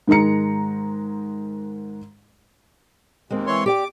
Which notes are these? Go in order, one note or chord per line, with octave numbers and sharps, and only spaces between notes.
G#2 D#3 G#3 A#5 C#7
D#2 G#3 A#3 C4
E3 C#5 C6
G4 D5 G5 D6